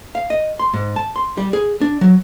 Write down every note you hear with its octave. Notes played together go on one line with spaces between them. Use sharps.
F5
D#5
C6
G#2
A5
C6
G3
G#4
D4
F#3